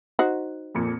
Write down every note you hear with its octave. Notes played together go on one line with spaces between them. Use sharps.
D#4 F#4 C5
F2 A#2 C#7